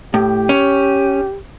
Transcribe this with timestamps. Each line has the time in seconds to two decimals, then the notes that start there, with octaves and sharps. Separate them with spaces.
0.14 A2 G4
0.49 C#4